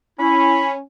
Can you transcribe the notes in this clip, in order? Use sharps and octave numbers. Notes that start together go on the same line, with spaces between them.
C#4 E4 B5